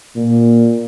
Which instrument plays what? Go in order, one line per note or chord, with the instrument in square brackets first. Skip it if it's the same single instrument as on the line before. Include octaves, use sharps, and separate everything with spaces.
[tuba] A#2